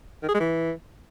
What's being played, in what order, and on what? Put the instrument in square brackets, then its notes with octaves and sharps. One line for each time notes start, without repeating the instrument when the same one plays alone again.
[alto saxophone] D#3
G#4
G#3
E3